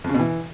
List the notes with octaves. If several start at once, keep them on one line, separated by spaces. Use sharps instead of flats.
F2
C#3
B2
E3